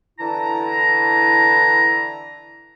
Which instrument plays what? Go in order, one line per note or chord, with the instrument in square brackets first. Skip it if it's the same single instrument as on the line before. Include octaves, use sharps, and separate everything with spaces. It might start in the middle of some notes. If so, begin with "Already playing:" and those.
[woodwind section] D3 E3 E4 A5 A#5